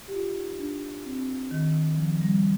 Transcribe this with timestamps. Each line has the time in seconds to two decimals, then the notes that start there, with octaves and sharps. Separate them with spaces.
0.08 G4
0.12 F4
0.36 D#4
0.59 D4
1.05 C4
1.51 D#3
1.97 F3
2.21 G3